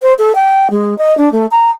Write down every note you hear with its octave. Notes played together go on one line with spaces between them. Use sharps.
C5
A4
G5
G#3
D#5
D4
A3
A#5